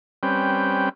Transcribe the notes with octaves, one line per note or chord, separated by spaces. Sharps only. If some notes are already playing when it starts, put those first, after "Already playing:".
G3 C4 C#4 B4 G5